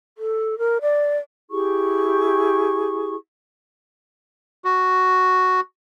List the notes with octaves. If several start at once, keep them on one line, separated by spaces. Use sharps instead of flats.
A4
A#4
D5
E4 G4 G#4 C#6
F#4